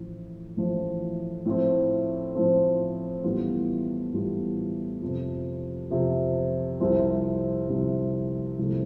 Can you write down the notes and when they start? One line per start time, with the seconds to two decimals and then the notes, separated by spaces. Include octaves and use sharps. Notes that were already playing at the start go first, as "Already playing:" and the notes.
Already playing: A1 A2 F3
0.57 A1 A2 F3
1.46 A2 F3 C4
2.35 A2 F3 C4
3.23 A1 A2 G3 B3 F4
4.13 A1 A2 G3 B3 F4
5.02 F2 C3 F3
5.90 F2 C3 F3
6.80 C2 C3 F3 C4
7.69 C2 C3 F3 C4
8.59 C2 C3 F3 A3